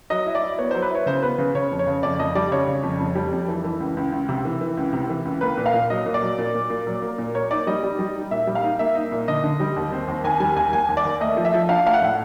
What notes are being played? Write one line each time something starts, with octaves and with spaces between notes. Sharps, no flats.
F#3 D#5
E4
D5
E4
B3 C#5
C5
F#3
B4
E4 C#5
C#3 C5
B3 B4
C#3
C#3 C#5
F2
C#5
C#3
F2 D5
F2 D#5
G3 D5
C#3 C#5
C#3
F2
F2
G3
F2
E3
E3
C#2
C#2
C#2
C3
E3
E3
C#2
C3
E3
C#2
A#3 B4
A#2
F5
A#2
F#3 D#5
A#2
D5
F#3
A#2
A#2
A#2
F#3
A#3
A#2
A#3 C#5
D#4 D5
G3 D#5
G3
G3
D#4
A#2 E5
G3
F5
D#4
A#3 E5
D#4
A#2
D3 D#5
D3
G3
D#2
C4
D#2
D#2 G#5
G3 G#5
D#2 G#5
D#2 G#5
D#2
D5
D#2
A3 D#5
F3
E5
F3
D4 F5
A3 F5
F#5
A2